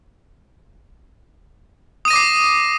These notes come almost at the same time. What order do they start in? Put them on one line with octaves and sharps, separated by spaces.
D#6 D#7 A#6 D6 C7